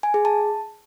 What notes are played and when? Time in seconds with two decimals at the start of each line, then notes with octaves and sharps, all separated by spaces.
0.03 G#5
0.14 G#4
0.25 A5